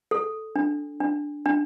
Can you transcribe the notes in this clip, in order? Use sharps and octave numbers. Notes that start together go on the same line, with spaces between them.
A4
D4
D4
D4